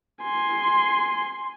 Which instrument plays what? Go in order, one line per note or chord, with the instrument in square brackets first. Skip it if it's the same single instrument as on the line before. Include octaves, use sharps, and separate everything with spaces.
[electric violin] G#5 C6